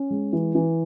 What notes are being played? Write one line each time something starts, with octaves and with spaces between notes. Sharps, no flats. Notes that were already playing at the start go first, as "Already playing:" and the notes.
Already playing: C#4
G#3
E3
E3